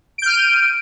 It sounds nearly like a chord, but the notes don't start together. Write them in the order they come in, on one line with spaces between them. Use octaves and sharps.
D7 G6 F6 D#7